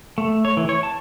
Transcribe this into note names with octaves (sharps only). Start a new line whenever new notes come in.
A3
C#5
E3
C#5
A5